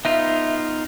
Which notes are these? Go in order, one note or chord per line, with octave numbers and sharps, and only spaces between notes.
B3 D#4 F4 E5